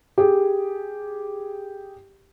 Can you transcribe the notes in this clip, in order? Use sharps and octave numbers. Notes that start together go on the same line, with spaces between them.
G4 G#4